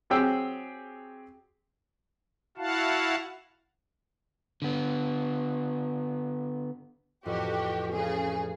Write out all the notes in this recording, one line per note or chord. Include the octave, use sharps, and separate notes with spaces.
F#3 C4 G4 G#4 G5 E6
E4 F#4 F5 F#5 A5
D3 B3
A1 F2 A2 F#4 G4
C#3 G#4